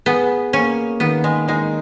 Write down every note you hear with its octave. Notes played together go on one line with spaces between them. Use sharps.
B3 G#4
A#3 C#4
D#3 B3
G#3
G#3 D#4